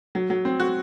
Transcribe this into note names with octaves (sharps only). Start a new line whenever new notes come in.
F#3
F#3
C4
F#4